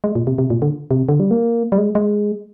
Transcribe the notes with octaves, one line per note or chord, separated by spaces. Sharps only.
G#3
A#2
C3
C3
A#2
D3
C3
D3
G3
A#3
G3
G#3
G#3